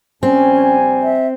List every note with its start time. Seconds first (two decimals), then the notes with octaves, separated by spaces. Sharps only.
0.23 A#1 G3 C4 C#4 G#5
1.03 E5